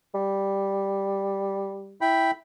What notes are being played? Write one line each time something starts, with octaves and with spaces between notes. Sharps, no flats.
G3
E4 G5 B5